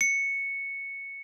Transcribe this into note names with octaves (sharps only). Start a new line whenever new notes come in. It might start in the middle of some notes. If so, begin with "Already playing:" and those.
C#7